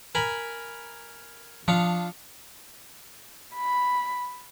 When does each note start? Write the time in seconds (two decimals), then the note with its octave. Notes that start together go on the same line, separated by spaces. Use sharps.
0.15 A#4 G#5 B5
1.68 F3 D4 F4 C#7 F7
3.55 B5